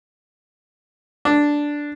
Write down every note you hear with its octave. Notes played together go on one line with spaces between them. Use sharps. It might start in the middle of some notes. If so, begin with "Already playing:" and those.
D4